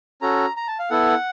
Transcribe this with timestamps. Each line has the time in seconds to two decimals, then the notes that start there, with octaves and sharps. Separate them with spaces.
0.22 C#4 F#4 A4 A#5
0.56 A#5
0.68 A5
0.79 F5
0.90 B3 E4 A4 F#5